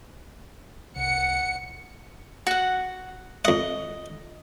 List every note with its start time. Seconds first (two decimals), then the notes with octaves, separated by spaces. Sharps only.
0.96 C2 F#5 C#7
2.47 F#4 F#5
3.45 F2 D#5 F#5